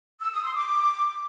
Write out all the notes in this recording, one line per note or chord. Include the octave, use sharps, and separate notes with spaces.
E6
D#6
C6
D6